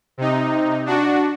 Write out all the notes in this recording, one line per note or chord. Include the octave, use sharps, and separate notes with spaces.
C3 D#4
D4 F#4